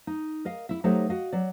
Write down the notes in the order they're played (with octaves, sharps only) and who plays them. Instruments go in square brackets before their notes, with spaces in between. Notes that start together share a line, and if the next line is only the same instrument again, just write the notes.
[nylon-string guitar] D#4
A#4 D#5 F5
E4 E5
F#3 A3 D#4 G4 A4 C5
F#4 D#5 F5
F#3 D5